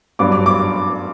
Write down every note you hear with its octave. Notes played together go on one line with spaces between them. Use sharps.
G2 F#3 B3 D4 D6
D6
D6